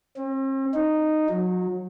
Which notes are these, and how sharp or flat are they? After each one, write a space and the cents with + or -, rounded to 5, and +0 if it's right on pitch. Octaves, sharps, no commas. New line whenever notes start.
C4 +45
D#4 -10
F#3 -30